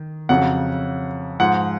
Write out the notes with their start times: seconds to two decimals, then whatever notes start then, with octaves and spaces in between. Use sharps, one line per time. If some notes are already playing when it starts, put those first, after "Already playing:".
Already playing: D#3
0.29 F2 C#3 F#3 F#5
1.40 G#2 F3 F#5